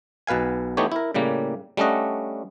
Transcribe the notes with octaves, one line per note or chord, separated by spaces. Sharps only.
B1 B2 B4 F5 G#5
E3 A3 B3 D#4 G4 C#5
E4 A#4
A2 C#3 G3 A#3
G3 A3 C#4 D4 D#5 F#5